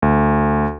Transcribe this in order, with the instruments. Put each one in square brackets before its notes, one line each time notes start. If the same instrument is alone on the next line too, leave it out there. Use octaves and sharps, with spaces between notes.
[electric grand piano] D2